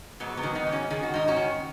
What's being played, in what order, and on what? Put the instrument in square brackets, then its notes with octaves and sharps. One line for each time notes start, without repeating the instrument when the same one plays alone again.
[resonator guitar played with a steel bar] G#2 F#3 B3
F#3 B3
D#3
B3 D#4
G#2
C#4 F#4
D#3 G#4
F#4
G#2 D#4
C#4 F#4
D#3